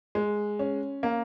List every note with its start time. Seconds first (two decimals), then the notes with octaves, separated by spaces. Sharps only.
0.15 G#3
0.59 C#4
1.03 A#3